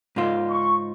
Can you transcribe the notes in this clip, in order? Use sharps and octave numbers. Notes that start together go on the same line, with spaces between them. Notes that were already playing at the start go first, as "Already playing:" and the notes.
G#2 D#4 F4
C#6